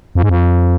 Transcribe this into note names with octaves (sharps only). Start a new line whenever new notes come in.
F2
G#2
F2